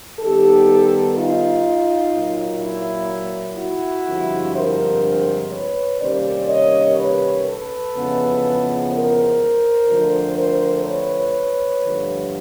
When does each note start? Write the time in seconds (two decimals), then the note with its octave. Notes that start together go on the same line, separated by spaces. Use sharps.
0.20 D#3 G3 B3 D#4 G4 A4
1.16 D#4 F4
2.13 A#2 F#3 A#3
2.62 E4
3.59 E4 F#4
4.07 G2 D3 F3 G#3 C4
4.56 A#4 C5
5.52 B4 C#5
6.01 C3 D#3 G3 A#3 C#4 C5 D5
6.49 C#5 D#5
6.98 B4 C#5
7.46 A4 B4
7.95 F2 C#3 E3 G#3 B3
8.91 A#4 C5
9.89 F2 D3 F3 A3 D4
10.37 A#4 C5
10.85 B4 C#5
11.82 G2 D3 F3 A3